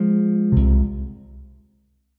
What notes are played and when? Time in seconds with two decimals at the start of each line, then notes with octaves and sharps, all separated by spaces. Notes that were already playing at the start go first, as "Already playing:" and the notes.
Already playing: F3 G#3
0.52 C2 C3